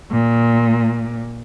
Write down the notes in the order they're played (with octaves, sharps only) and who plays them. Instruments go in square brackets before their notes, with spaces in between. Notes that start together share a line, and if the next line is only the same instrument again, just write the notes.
[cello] A#2